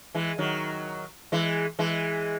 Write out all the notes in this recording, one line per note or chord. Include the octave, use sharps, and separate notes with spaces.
E3 G#3
D#3 F#3
E3 G#3
E3 G#3